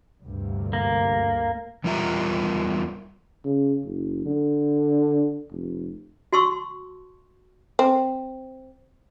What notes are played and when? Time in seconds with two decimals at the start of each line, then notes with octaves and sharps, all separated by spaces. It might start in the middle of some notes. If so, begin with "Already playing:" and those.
0.22 D2 G2 C3
0.73 A#3
1.84 E2 G3 F4 A#4 E5 A#5
3.45 C#3
3.85 F#1
4.25 D3
5.52 F1
6.33 F#4 A5 C6 C#6 E6
7.79 C4